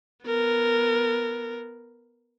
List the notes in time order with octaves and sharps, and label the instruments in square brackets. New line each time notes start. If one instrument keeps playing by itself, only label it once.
[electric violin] B3 A#4